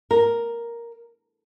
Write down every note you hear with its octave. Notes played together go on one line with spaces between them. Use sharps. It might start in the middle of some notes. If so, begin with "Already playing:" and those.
A#4